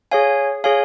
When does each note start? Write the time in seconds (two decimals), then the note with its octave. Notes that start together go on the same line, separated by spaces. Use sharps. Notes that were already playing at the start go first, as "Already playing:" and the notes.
0.11 G#4 C#5 F5 G#5
0.64 G#4 C#5 F5 G#5